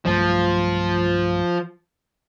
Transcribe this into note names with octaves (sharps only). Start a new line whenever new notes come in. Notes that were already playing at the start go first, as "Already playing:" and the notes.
B1 G2 F3 A3